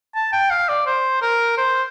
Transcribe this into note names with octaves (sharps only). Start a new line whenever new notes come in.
A5
G5
F5
D5
C5
A#4
C5